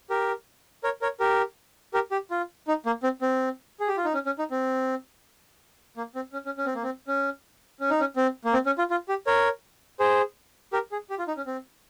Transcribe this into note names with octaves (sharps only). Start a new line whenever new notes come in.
G4 A#4
A#4 C#5
A#4 C#5
G4 A#4
G4 A#4
G4
F4
D#4
A#3
C4
C4
G#4
G4
F4
D#4
C#4
C#4
D#4
C4
A#3
C4
C#4
C#4
C#4
C4
A#3
C4
C#4
C#4
D#4
C#4
C4
A#3
C4
C#4
F4
F4
G4
A#4 C#5
G#4 C5
G4 A#4
G#4
G4
F4
D#4
C#4
C4